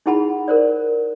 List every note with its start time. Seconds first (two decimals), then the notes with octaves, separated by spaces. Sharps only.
0.06 D#4 E4 G#4 F#5 A5 B5
0.48 A#4 C5 D5